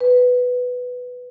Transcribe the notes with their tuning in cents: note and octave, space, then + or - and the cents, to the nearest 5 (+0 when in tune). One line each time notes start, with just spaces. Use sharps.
B4 +5